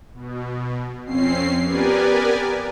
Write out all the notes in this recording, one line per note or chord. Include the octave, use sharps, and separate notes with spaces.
B2
F2 C4 C#4 C7
B3 G4 A#4 B4 D5 G#5